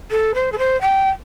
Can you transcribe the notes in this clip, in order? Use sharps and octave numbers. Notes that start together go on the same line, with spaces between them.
A4
C5
A4
C5
G5